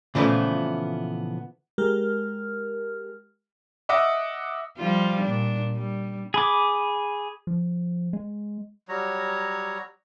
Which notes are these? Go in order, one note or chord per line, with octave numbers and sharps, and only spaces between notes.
A#2 C#3 E3 F3 A3 B3
G#3 G4 A#4 F6
D#5 E5 F#5 D6 D#6
F3 G3 F4
A#2 D4
G3
G#4 B5 D6
F3
G#3
F#3 G3 C#5 A#5